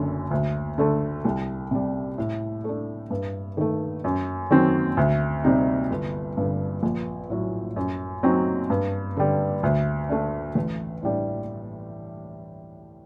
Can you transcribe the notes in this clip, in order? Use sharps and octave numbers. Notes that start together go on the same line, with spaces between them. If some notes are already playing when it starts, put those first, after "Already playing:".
Already playing: F#1 F#2 D3
D2
D3 A3
C2
C3 G3
A2
A3 D4
G2
D#3 A3
F#2
D#3 F#3 C4
D2
C3 G3 C4 D#4
G1
G2 D3
A#1
A2 F#3
F#2
F#3 C4 D#4
G2
D3 G3
D2
D3 A3 D4
A1
A2 G3 D4